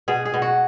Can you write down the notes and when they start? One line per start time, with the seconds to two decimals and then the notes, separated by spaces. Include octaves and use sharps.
0.08 B2 G#4
0.25 G#4
0.34 B2
0.42 F#4